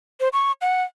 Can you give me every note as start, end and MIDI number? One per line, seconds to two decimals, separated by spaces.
0.20 0.28 72
0.33 0.52 85
0.61 0.83 78